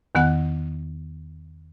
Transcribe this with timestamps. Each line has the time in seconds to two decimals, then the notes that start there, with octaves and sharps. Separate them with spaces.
0.15 E2 D#3 B3 F#5 F#6